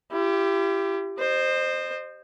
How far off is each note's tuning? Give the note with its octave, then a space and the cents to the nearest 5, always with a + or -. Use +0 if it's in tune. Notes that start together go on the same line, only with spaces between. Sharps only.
E4 +45 G4 +0
C5 +5 D#5 -30